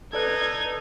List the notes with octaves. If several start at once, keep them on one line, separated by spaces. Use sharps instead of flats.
D#4 A4 B4 D5 F#6 G#6